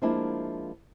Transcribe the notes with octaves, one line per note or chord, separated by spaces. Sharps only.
F3 G#3 A#3 D4 E4